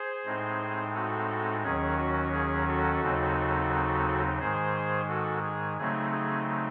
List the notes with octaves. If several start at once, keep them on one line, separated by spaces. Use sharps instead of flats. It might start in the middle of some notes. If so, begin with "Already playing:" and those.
Already playing: G#4 C5
A2 G#3 C4 D#4
F#4 A4
D#2 D#3 F#3 C#4 G#4
F#4
G#4
F#4 A4
D#2 C#3 F#3 C4 D#4
G#2 D#3 G#3 G#4 C5
F#4 A4
G#4
C#3 F#3 A3 C4 D#4 G#4
G#4